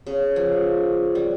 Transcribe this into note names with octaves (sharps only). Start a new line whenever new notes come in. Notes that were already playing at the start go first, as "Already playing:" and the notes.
C#3
F3
G3